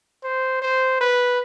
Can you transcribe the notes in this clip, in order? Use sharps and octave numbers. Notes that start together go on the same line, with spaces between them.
C5
C5
B4